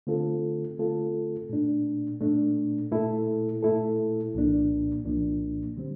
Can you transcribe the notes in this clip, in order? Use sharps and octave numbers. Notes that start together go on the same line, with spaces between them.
D3 A3 C4 F4 A4
D3 A3 C4 F4 A4
A#2 A3 D4
A#2 A3 D4
A#2 A3 E4 A4
A#2 A3 E4 A4
C2 A#2 F3 A#3 D4
C2 A#2 F3 A#3 D4
D3 G3 C4